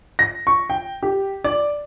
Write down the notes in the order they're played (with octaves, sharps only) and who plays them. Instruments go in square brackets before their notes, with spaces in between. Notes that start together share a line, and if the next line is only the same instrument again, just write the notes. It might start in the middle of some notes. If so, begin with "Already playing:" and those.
[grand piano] A#6
C#6
G5
G4
D5